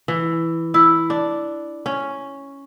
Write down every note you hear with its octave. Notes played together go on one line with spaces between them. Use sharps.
E3
E4
D4
C#4